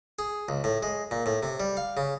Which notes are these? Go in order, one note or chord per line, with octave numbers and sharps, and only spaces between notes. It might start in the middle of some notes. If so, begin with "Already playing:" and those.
G#4
C#2
A2
G#3
A#2
A2
C3
G3
F5
C#3